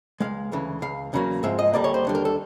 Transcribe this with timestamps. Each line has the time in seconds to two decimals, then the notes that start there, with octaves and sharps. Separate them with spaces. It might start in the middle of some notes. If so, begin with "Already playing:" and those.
0.20 C#2 B2 G#3 F5
0.52 D2 C#3 E3
0.82 C#2 C#3 F5
1.13 E2 C#3 F#3 A#3
1.43 G#2 F3 G#3 C4 E5
1.59 D#5
1.73 D2 D3 G3 A#3 D5
1.84 C#5
1.94 C5
2.05 D#2 D3 G3
2.15 A#4
2.25 A4